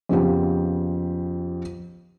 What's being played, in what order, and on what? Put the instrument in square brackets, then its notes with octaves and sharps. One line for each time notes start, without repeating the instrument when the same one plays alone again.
[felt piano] F2 C#3 B3 F4 G4